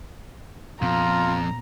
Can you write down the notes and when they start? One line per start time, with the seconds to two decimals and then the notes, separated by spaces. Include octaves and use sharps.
0.82 F2 A#2 B3 C#4 F4 A#5